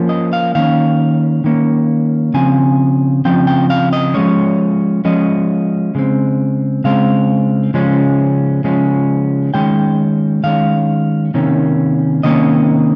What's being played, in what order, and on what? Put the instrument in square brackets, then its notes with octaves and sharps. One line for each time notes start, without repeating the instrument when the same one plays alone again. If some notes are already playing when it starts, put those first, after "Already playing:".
Already playing: [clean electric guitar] F3 A#3 C#4
D#5
F5
D#3 A#3 C#4 F5
D#3 A#3 C#4
C#3 F3 C4 G#5
C#3 F3 C4 G5
G5
F5
D#5
F3 G#3 C#4 C#5
F3 G#3 C#4 D#5
C#3 G#3 C4
C#3 G#3 C4 F5
C#3 F3 G#3 C#4
C#3 F3 G#3 C#4
D#3 G#3 C#4 G5
D#3 G#3 C#4 F5
C3 D#3 A#3 C#4
C3 D#3 A#3 C#4 D#5